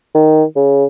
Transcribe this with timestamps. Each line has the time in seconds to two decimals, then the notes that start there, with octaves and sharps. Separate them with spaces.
0.15 D#3
0.56 C#3